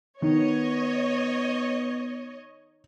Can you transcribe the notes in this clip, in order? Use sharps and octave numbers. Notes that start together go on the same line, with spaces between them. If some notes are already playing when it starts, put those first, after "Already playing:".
D#3 B3 C#5 D#5